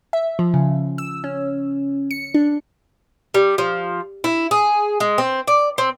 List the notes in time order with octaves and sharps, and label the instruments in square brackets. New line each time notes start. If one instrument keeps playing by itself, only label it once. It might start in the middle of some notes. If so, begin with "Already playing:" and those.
[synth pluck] E5
F3
C#3
E6
C#4
C#7
D4
[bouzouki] G3
F3
E4
G#4
G#3
C4
D5
C4